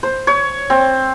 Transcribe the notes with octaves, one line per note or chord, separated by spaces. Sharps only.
C5
C#5
C4